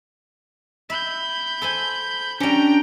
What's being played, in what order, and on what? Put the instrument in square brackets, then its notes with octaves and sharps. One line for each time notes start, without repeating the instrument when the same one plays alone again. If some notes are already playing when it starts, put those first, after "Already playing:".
[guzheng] E5 [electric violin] B5 G6
[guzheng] A4 C5 G#5
[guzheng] G3 C#4 [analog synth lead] D4 [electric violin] G5 A#5